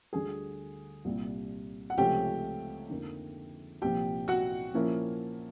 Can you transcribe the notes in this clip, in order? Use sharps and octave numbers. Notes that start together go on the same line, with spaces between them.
D2 D3 G3 G#4 G#5
C2 A#2 G3
F#5
C#2 C3 F3 A3 C#4 G4 G5
F2 D3 F3 A#3 D#4
C2 A#2 F3 G4 G5
F#4 F#5
A#2 F3 A#3 C#4 E4